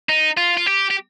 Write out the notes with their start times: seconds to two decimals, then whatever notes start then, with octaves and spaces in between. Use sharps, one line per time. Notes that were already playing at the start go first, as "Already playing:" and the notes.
0.09 D#4
0.37 F4
0.57 F4
0.67 G4
0.91 G4